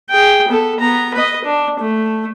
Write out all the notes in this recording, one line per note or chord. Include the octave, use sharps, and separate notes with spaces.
G#4 G5
B3 A4
B3 A#5
B4 D#5
D4
A3